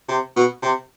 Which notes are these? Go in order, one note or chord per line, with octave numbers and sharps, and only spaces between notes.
C3
B2
C3